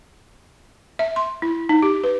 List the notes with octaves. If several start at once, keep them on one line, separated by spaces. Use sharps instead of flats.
E5
C6
E4
D#4
G4
B4